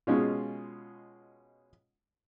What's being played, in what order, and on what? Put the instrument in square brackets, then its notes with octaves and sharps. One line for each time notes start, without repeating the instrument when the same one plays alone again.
[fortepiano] B2 G#3 C#4 F4